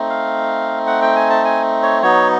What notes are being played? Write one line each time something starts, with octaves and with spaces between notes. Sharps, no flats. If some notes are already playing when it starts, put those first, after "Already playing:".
Already playing: A3 C4 D#4
F5
F#5
G5
G#5
A5
G#5
C#5
F#3 B3 D#4 C#5